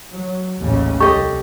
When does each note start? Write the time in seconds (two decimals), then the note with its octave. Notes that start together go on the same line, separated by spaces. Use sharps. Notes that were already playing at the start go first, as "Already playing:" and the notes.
0.12 F#3
0.60 A1 D#2 C#3
1.00 C2 G4 A4 D#5 C#6